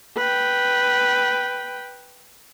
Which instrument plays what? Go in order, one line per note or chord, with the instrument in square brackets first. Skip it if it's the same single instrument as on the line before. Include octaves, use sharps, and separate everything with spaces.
[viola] B4 G5